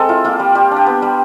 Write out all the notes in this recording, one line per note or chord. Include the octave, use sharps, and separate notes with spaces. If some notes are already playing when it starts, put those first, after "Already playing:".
Already playing: G#3 C4 A4
E4 F4
A#3 F4
G3
G3 G4
D4 G4
B3
G3